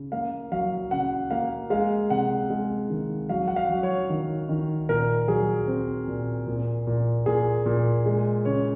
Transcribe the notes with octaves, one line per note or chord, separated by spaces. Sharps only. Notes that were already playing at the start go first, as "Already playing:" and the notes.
Already playing: C#3
A#3 F5
F#3 F5
C#3 F#5
A#3 F5
G#3 F5
C3 F#5
G#3
D#3
F#3 F5
F#5
F5
F#3
C#5
D#3
D#3
A#2 A#4
F#3 G#4
C4
A#2
A#2
A#2
A#2 G#4
A#2
G#3
C#3 C#5